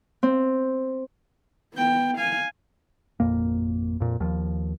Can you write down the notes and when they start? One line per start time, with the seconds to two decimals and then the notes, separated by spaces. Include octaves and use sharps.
0.23 C4
1.74 B3 G5
2.17 F5 G#5
3.20 G#1 F2 A#2 A#3
4.00 F2 A#2
4.20 D#2 F3